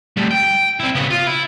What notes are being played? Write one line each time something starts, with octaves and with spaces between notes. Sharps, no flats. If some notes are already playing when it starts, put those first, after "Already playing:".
G3 A3
G5
C4 E4
C#3 B3
F4
E4